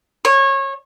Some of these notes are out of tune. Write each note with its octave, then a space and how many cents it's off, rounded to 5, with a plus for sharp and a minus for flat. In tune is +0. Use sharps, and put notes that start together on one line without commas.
C#5 -25